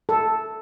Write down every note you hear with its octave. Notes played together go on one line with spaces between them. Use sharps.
A4